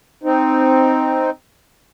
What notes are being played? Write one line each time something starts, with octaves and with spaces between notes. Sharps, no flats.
C4 D#4